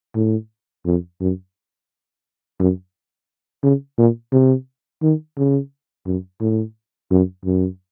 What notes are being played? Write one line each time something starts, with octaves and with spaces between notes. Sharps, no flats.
A2
F2
F#2
F#2
C#3
A#2
C3
D#3
C#3
F#2
A2
F#2
F#2